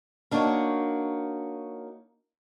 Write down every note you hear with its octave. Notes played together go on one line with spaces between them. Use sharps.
A#3 D4 D#4 F#4 C#5